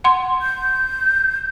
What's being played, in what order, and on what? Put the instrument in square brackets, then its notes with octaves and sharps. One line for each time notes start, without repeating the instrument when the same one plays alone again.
[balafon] F#5 C6
[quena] G6